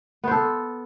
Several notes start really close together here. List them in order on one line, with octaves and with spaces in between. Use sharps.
B3 C5 A4